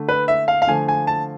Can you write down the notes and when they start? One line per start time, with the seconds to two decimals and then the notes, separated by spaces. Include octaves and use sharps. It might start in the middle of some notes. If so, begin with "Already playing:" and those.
Already playing: D3 A3
0.09 B4
0.28 E5
0.48 F5
0.62 F5
0.67 D3 F3 A3 G#5
0.88 G#5
1.07 A5